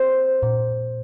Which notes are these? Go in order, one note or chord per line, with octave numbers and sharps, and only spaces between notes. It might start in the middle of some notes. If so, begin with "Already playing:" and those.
Already playing: C5
A#2